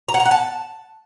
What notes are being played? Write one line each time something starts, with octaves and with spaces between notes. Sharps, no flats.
A#5
F#5
A#5
F#5
A5